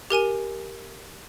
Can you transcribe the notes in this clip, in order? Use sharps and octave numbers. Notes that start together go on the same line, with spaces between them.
G4 A#4 G#5 D#7